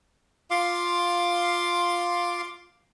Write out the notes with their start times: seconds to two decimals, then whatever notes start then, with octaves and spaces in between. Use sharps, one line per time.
0.51 F4 F5 C6 D6